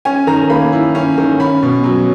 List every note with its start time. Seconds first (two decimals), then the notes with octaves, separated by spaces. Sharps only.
0.05 C#4 G#5
0.27 D#3 A#5
0.49 A#3 B5
0.72 E4
0.95 C#4
1.18 D#3
1.40 C#4 B5
1.62 B2
1.84 F#3